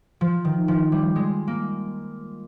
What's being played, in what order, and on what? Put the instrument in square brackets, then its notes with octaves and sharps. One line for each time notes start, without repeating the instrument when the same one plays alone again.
[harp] F3
D#3
F3
G3
G#3
A#3